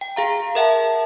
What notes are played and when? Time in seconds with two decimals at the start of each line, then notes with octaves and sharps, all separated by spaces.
0.01 G5
0.16 G#4 F5 A#5
0.55 A#4 E5 F#5 A5